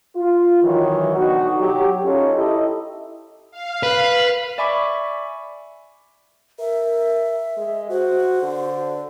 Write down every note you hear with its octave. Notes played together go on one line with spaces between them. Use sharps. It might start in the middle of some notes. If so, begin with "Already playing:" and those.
F4
D#3 E3 F#3
B2 D3 D#4 F#4
F#3 G4
C#4 D#4 F4 G4 A4 C#5
E4 G4 A4 D#5
F5
B4
D5 E5 G#5 B5 C#6 D6
A#4 E5
G#3
F#4 C5
D3